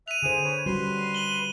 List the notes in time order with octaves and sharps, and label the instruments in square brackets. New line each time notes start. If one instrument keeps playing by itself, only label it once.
[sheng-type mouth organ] E5 F#6 [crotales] D#7 F7
[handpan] D3 C5 [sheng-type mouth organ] G#4
[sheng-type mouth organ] B4 C#5
[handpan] G3 C#4 F#4 [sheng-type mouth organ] B4 C6
[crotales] D#7 F#7 G7